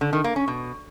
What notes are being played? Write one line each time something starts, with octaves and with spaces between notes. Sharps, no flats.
D3
D#3
A#3
C#4
B2